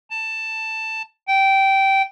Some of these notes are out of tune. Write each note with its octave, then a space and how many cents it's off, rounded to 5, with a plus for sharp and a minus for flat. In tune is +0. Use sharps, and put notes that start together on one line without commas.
A5 +10
G5 -15